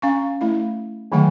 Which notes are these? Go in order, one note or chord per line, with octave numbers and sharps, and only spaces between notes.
C#4 F5 A#5 C#6
A3 E4 F5
D3 D#3 F#3 A3 F#5 G5